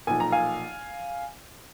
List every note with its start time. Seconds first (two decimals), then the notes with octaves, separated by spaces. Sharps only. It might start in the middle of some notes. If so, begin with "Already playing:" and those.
0.07 B1 A#2 F3 G#5
0.20 A#5
0.32 F5 G#5